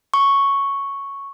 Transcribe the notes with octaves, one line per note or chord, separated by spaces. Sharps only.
C#6